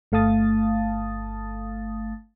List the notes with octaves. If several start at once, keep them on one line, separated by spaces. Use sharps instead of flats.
G1 A3 F5 A5 D#6 A6